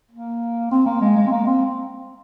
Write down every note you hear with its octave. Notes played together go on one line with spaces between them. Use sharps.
A#3
C4
A#3
G#3
G#3
C4
A#3
C4